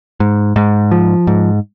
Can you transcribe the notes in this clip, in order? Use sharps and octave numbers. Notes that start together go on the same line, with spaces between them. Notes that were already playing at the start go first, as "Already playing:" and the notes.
G#2
G#2
F3
G#2